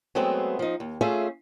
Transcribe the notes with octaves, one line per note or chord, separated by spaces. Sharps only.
F#3 G#3 A3 B3 C4
F3 D#4
D#2
A3 C#4 F4 G#4 E5